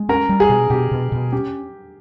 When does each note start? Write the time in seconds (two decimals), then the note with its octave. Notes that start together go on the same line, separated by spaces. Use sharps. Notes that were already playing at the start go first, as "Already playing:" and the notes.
Already playing: G#3
0.09 C#4 A#4
0.29 G3
0.40 G#4
0.49 B2
0.70 B2 G4
0.91 B2
1.12 B2
1.32 C#4 G4